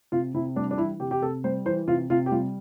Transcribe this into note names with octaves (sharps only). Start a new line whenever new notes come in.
C3 F4
C3 E4
G3 D4
D4
E3 E4
C3 G4
G4
C3 A4
G3 C5
E3 C5
C3 F4
C3 F4
G4
G3 F4